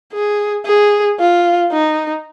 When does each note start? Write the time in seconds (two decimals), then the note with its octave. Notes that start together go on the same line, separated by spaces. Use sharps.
0.13 G#4
0.66 G#4
1.19 F4
1.72 D#4